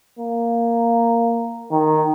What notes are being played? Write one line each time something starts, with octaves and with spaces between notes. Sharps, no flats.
A#3
D#3